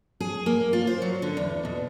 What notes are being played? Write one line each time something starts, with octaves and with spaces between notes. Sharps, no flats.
G#4
A#3
F4
C5
F#3
D3
E2
B2